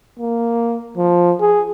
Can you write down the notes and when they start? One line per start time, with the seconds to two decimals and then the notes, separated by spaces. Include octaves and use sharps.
0.19 A#3
0.97 F3
1.40 G#4